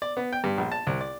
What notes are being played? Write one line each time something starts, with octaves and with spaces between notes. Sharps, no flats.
D5
B3
G5
G2
A#1
A5
C2
D5